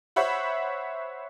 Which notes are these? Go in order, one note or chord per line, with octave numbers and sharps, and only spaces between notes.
C5 C#5 E5 F#5 B5